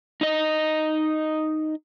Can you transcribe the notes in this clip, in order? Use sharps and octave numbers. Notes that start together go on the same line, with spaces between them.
D#4 D#5